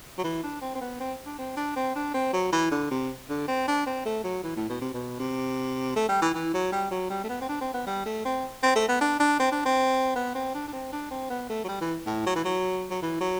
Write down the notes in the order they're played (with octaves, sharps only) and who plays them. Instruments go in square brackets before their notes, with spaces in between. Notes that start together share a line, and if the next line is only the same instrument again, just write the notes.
[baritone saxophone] F#3
E3
D4
C4
C4
B3
C4
D4
C4
D4
C4
D4
C4
F#3
E3
D3
C3
D3
C4
D4
C4
A3
F#3
E3
A2
B2
C3
B2
C3
A3
G3
E3
E3
F#3
G3
F#3
G3
A3
B3
C4
D4
C4
B3
G3
A3
C4
C4
A3
B3
D4
D4
C4
D4
C4
B3
C4
D4
D4
C4
D4
C4
B3
A3
F#3
G3
E3
A2
F#3
E3
F#3
F#3
E3
F#3